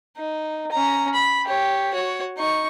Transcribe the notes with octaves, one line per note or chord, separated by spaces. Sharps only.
D#4
C#4 A#5
B5
G4 C#5
F#4 C#5
D#4 C#6